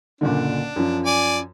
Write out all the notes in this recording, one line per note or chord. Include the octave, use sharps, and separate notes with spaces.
F#1 A#2 D3 D4
F#2 F3
D5 G#5